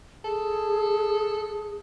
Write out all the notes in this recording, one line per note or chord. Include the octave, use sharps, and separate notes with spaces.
G#4 A4